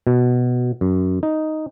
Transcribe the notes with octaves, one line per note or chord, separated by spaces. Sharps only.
B2
F#2
D#4